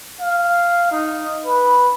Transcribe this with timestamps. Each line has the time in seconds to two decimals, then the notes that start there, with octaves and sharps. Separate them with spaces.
0.21 F5
0.91 D#4
1.46 B4